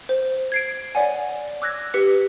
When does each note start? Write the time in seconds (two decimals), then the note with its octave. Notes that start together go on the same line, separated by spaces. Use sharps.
0.09 C5
0.52 G#6 C7 D7
0.95 C#5 D5 F#5 G#5
1.62 D6 E6 F#6 G#6 A#6
1.94 G4 B4 B6 C#7